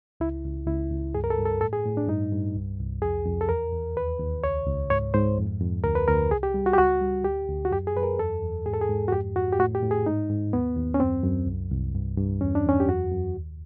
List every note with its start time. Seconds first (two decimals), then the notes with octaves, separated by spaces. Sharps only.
0.20 C#2 E4
0.45 C#2
0.67 C#2 E4
0.91 C#2
1.15 G2 G#4
1.24 A#4
1.30 A4
1.38 G2
1.45 A4
1.61 A2 A4
1.73 G#4
1.86 A2
1.97 D4
2.08 G2 D#4
2.32 G2
2.56 C2
2.80 C2
3.02 F2 G#4
3.25 F2
3.41 A4
3.49 E2 A#4
3.73 E2
3.96 D#2 B4
4.19 D#2
4.43 C#2 C#5
4.67 C#2
4.90 G#2 C#5
5.14 G#2 C5
5.38 F2
5.60 F2
5.84 D2 A#4
5.95 B4
6.08 D2 A#4
6.31 C2 G#4
6.43 G4
6.54 G3
6.66 F#4
6.73 G4
6.78 C#2 F#4
7.01 G3
7.24 D2 G4
7.49 D2
7.65 F#4
7.71 F#2 G4
7.87 G#4
7.96 F#2 B4
8.03 A#4
8.19 E2 A4
8.42 E2
8.66 G#2 G#4
8.74 A4
8.81 G#4
8.89 G#2
9.08 F#4
9.12 F2 G4
9.36 F2 F#4
9.53 G4
9.59 A2 F#4
9.75 G4
9.83 A2
9.91 G#4
10.06 G#2 D#4
10.30 G#2
10.53 D#2 B3
10.77 D#2
10.94 C#4
11.00 F#2 C4
11.23 F#2
11.47 C2
11.72 C2
11.95 G2
12.18 G2
12.41 E2 C#4
12.55 D4
12.65 E2 C#4
12.80 G4
12.88 F#2 F#4
13.11 F#2
13.36 D#2